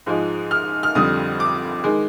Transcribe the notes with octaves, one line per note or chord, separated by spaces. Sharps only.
G#2 F3 G#3
F6
F6
F2 D3 G3 D#6
D6
D#3 G#3